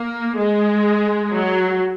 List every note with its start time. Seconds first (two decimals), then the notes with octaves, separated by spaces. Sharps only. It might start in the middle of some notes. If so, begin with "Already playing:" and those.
Already playing: A#3
0.39 G#3
1.32 F#3